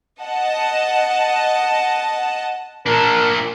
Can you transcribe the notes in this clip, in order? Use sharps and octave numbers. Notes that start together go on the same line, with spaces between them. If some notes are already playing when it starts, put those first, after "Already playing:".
D#5 F#5 A5
A#2 D4 A#4